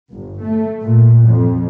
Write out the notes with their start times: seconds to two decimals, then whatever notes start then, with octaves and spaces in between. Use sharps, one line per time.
0.11 G1
0.42 A3
0.81 A#2
1.27 F2